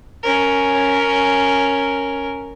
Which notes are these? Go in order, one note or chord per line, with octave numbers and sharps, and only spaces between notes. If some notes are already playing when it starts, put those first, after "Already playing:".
C#4 A#4